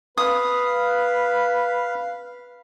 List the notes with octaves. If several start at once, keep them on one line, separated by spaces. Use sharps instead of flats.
B4 F5 D#6